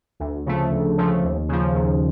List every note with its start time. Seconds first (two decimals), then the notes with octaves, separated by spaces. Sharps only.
0.20 D2
0.46 C#3 F3 A3
0.71 D2
0.98 C#3 F3 A3
1.24 D#2
1.49 C#3 F3
1.75 D#2